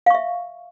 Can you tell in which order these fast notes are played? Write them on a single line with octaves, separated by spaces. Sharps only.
F5 C#6 E5